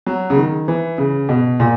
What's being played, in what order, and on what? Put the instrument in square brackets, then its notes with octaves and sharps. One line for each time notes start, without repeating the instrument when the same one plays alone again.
[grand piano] F#3
C#3
D#3
E3
C#3
B2
A#2